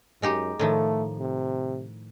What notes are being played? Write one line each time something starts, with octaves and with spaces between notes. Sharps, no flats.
F#2 G#3 D#4 G4
A2 D#3 F3 A3
C3